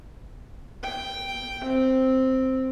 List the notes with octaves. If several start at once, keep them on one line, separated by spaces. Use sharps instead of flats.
G5
C4